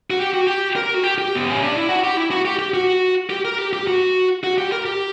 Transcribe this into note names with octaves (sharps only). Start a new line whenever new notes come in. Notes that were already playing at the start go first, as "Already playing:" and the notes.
F#4
G4
F#4
G4
A#4
F#4
G4
G4
B3
C#4
D4
E4
F#4
G4
E4
F#4
G4
G4
F#4
G4
A#4
G4
G4
F#4
F#4
G4
A#4
G4